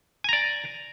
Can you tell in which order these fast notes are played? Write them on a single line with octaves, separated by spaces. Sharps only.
G#5 A#5 D5